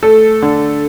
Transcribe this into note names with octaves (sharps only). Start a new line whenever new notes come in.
A3 A4
D3